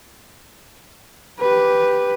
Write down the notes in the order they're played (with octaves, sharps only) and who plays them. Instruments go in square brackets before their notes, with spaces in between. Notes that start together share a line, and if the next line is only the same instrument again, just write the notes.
[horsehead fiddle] G4 B4